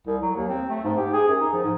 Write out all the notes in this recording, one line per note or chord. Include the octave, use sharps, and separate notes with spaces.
C2
F#3
D#2
C4
A3
G#2
G4
G#4
F#2
D#4
F3
G#2